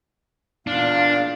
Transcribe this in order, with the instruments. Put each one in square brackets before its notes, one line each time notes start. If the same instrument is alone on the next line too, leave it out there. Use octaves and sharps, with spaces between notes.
[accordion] E2 A#2 F5 [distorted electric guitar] D4